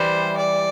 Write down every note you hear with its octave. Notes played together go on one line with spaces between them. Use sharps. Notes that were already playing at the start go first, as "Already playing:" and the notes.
Already playing: E3 G3 C5
D5